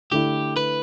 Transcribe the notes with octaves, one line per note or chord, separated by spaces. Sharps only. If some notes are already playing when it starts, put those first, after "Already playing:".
D3 A3 E4 G4
B4